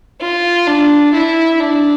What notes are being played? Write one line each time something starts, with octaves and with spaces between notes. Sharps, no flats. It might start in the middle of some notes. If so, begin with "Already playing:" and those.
F4
D4
E4
D4